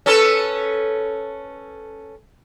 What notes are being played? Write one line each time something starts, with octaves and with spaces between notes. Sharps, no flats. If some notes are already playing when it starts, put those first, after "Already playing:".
C#4 A4 B4